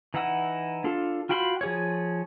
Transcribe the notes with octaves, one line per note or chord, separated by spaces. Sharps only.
E3 D#4 E4 F#5 E6
D4 F4 A4
F4 F#4 G5 B5 C6
F3 G#4 C#5